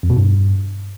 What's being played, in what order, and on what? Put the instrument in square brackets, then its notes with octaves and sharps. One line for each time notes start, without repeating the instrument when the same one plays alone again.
[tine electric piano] F2
B2
G2